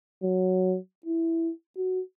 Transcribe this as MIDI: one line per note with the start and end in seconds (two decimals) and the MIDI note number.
0.23 0.77 54
1.06 1.51 64
1.77 2.01 66